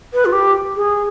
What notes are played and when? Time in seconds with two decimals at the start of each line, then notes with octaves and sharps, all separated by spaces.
0.13 B4
0.25 F4
0.32 G4
0.76 G#4